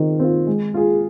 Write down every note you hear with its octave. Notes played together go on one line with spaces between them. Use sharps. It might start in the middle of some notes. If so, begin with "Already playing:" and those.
Already playing: D#3 C4 F4
C4 F4
G#3
F4 G#4